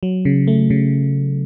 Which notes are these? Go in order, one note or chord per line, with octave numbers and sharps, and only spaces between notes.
F#3
C#3
A3
C#3